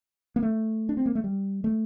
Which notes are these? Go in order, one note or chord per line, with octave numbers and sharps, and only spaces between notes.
A#3
A3
D4
C4
A#3
A3
G3
A3